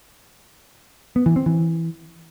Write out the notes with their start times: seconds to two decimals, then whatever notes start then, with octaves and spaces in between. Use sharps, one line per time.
1.16 B3
1.26 E3
1.36 C4
1.46 E3